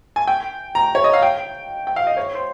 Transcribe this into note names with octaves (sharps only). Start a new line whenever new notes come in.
G#5
G5
A#5
C#5
D#5
F5
G5
G5
F5
D#5
C#5
C5